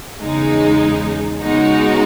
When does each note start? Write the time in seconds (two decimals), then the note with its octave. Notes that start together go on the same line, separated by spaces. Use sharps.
0.20 E2 C#3 G#3 D#4
1.42 C#3 G#3 B3 D#4 F#4